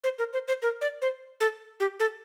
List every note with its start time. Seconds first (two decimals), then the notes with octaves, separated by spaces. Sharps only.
0.04 C5
0.19 A#4
0.33 C5
0.48 C5
0.62 A#4
0.81 D5
1.02 C5
1.40 A4
1.80 G4
2.00 A4